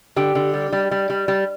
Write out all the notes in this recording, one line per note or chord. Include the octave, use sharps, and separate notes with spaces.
D3 G4
D3
G3
G3
G3
G3
G3